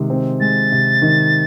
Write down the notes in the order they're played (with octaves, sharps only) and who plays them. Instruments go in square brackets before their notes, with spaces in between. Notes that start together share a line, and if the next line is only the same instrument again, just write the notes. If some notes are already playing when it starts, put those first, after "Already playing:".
Already playing: [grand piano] C3 D#3 G#3
C4
[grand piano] G#3 [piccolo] A6
[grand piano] C3
D#3